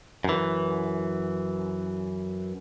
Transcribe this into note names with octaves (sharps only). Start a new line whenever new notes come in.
F#2 E3